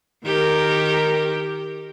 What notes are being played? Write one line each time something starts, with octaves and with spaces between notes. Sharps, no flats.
D#3 G4 A#4